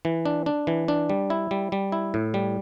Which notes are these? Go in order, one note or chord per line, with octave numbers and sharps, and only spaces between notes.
E3
D4
D4
E3
D4
G3
E4
G3
G3
E4
A2
G3